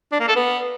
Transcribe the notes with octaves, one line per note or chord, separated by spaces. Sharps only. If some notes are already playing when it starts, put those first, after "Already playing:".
D4
A#3
A4
B3